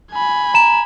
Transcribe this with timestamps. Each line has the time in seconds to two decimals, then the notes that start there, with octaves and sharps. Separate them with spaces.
0.11 G#5 B5
0.54 A#5 E7